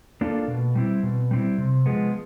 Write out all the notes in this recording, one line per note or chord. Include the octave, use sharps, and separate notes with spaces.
A#3 D4 F4 A4
B2
G3 C4 E4
B2
G3 C4 E4
C3
F3 G#3 B3